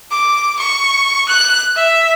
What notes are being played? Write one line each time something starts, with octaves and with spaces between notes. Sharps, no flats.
D6
C#6
F#6
E5